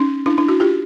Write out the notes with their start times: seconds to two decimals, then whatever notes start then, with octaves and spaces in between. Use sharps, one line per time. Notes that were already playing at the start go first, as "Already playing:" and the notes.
Already playing: C#4 D#4
0.26 D4 E4
0.38 D4 E4
0.48 E4 F#4
0.60 F4 G4